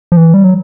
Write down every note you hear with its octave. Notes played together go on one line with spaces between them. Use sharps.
F3
E3
G3
F#3